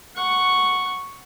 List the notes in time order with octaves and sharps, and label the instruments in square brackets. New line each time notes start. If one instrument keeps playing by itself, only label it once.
[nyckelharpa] F#5 C#6